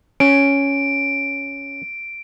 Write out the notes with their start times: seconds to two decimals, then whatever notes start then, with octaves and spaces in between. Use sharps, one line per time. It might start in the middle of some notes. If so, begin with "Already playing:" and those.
0.20 C#4 D7